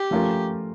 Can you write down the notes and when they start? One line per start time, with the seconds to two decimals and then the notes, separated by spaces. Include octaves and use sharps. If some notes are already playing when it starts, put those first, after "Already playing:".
Already playing: G4
0.11 F3 A3 C#4 F4 A#4